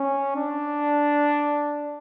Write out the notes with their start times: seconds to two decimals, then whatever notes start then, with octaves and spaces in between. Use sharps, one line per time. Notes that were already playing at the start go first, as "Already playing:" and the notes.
Already playing: C#4
0.36 D4